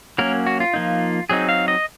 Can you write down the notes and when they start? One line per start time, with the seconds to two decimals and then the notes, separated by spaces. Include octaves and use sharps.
0.18 F#3 A#3 C#4 A#4
0.47 F#4
0.60 F4
0.74 F3 A#3 D#4
1.30 F#3 C4 D#4 G#4
1.49 F5
1.68 D#5